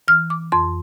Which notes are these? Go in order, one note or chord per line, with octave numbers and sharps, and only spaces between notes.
E3 F6
D6
F2 C6